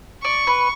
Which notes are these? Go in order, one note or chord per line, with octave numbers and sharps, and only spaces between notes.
D5 C#6
B4